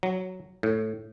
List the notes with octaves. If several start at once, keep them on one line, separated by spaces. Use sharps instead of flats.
F#3
A2